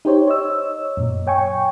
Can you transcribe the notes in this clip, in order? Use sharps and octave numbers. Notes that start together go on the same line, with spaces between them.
D#4 G4 C5 C#5
C#5 D#5 E6
F#2 A#2
C#5 G5 G#5 C#6